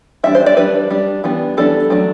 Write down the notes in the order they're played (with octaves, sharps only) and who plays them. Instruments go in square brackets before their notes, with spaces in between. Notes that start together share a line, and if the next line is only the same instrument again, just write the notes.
[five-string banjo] E3 G3 D4 E5
C5
D5
G3 D4 B4
G3 D4
E3 G3 B3 D4
E3 G3 B3 D4 A4
F#3 A3 D4